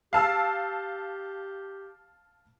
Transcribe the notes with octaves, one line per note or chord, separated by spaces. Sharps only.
G4 F5 A5 E6